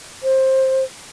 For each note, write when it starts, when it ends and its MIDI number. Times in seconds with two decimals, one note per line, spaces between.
0.23 0.84 72